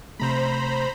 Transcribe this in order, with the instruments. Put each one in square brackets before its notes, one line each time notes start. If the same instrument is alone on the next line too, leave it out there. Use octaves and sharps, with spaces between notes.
[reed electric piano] C3 A3 [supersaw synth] C5 A#5 B5